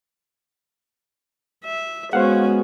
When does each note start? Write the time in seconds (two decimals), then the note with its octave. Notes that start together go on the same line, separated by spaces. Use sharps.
1.64 E5
2.13 G#3 B3 C#4 F#4 C5 F5 F#5